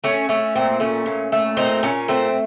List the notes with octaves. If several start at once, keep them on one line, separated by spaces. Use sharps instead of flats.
A3 C#4
A3 C#4
A#2 C4
A3 C#4
A#2
A3
A#2 C4 D#4
A#2 C#4
A3 C4